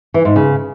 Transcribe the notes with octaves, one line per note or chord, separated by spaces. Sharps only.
E3
G#2
C#3